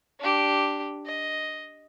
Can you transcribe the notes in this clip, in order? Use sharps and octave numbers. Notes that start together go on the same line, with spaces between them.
D4 G4
D#5